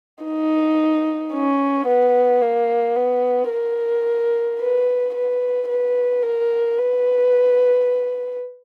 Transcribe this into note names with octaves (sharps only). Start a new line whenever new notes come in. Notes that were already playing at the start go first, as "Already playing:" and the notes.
D#4
C#4
B3
A#3
B3
A#4
B4
B4
B4
A#4
B4